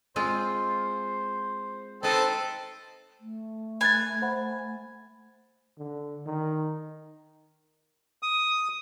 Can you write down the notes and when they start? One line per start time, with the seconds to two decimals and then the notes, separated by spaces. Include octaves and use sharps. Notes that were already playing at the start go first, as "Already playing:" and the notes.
0.16 G#3 C4 F4 C5
2.03 C4 D#4 A4 B4
3.20 A3
3.81 G#5 B5 F#6 A6
4.22 C5 F#5 B5
5.78 D3
6.26 D#3
8.23 D#6